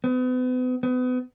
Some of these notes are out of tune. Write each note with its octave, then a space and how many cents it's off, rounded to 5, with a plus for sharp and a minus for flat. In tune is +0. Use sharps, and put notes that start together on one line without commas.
B3 +40
B3 +35